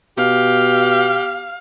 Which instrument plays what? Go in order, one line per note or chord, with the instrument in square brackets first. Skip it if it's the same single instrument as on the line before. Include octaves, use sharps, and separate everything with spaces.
[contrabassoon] B2 [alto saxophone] G4 [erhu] F5